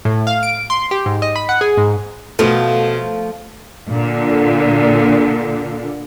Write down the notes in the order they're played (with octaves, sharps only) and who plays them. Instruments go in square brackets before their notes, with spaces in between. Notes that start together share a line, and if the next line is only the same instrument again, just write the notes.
[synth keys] A2
F5
D7
C6
G4
G#2
D#5
B5
F#5
G#4
G#2
[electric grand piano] B2 [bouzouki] F3 F4 [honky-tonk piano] A3
[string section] A#2 D3